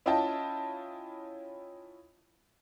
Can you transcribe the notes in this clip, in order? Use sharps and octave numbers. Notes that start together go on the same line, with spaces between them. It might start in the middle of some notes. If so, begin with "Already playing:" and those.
C#4 E4 F4 D#5 G5 A5